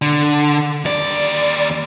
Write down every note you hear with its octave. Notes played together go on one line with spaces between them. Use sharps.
D3
D#2 D5